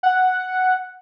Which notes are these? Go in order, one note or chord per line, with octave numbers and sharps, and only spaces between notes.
F#5